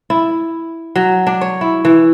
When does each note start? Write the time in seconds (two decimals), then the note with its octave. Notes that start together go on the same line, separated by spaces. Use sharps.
0.10 E4
0.96 F#3
1.27 D4
1.41 C#5
1.61 E4
1.85 E3